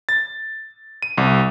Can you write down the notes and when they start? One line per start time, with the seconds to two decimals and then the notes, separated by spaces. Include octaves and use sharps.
0.09 A6
1.02 D#7
1.18 C2